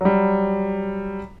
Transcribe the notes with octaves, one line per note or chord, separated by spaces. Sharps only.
F#3 G3